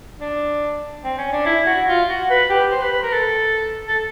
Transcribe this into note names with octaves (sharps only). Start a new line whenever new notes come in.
D4
C4
C#4
D4
E4
F#4
F4
F#4
B4
G4
C5
B4
B4
A#4
A4
A4